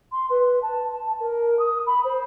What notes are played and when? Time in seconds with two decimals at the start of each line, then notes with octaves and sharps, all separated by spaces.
0.12 C6
0.30 B4
0.62 A5
1.19 A#4
1.59 D#6
1.86 B5
2.04 C5